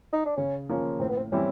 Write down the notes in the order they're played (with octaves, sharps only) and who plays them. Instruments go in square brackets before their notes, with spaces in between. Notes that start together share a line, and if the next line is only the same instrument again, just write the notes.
[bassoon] D#4
D4
[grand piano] C#3 [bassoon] C#4
[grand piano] F3 A#3 C#4 F4
[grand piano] A2 [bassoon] C4
[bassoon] B3
C4
[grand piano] E3 G3 C4 E4 [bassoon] C#4